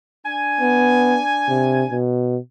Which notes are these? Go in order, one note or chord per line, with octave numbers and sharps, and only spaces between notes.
D4 G#5
B3
C3
B2